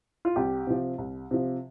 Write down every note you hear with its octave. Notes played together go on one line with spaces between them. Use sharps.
F4
C2 G4
C3 F3
C2
C3 F3